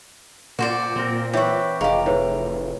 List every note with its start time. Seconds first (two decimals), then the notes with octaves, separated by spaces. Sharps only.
0.59 A#2 F#4 C5 D5
0.96 A#2 C4 A#4
1.33 E3 G4 C#5 E5 F#5 C#6
1.81 F1 G4 G#4 A#4 D#5 F5
2.06 A2 G#4 B4